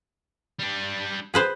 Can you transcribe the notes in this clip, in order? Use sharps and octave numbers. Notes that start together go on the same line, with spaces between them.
G3 D4
G#4 B4 C5